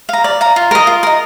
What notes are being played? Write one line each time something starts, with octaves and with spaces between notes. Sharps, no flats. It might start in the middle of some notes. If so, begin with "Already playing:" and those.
F5 A#5
D5
F5 A#5
F4
A#4 D#5
F4
A#4 D#5